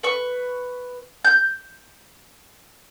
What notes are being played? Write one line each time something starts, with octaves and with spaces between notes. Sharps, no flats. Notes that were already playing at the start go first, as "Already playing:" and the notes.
B4 C#6
G6